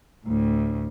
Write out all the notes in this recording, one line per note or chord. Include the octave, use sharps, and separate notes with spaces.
D2 A2